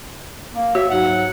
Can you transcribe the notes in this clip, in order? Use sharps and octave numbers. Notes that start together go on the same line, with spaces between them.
A#3
F#4 C#5 E5
G#2 F#3 F#5